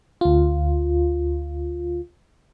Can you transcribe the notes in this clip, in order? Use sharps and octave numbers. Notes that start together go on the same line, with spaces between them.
D2 F4